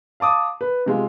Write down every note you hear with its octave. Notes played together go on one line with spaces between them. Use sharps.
F5 A5 D6 D#6
B4
C3 G#3 F4